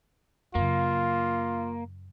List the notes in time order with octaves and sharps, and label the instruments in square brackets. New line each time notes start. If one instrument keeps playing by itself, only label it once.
[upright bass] F#2 C#3 [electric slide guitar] A#3 [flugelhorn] F4